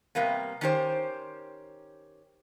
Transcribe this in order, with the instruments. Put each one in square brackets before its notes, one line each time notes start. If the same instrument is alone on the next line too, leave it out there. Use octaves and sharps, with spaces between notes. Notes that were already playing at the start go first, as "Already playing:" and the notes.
[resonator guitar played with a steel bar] C3 G3 A#3 B3
D#3 C#4 G4 C5